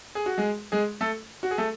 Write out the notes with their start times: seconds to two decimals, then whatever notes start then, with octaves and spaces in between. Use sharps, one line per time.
0.15 G#4
0.26 F#4
0.38 G#3 G#4
0.72 G#3 G#4
1.01 A3 A4
1.43 F#4
1.51 G#4
1.58 A3 A4